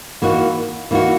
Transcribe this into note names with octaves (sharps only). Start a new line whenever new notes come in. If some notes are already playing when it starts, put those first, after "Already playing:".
E3 A#3 D#4 F#4
E3 A#3 D#4 F#4